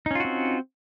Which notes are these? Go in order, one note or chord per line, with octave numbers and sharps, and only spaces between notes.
C4 C#4 D#4 F4 F#4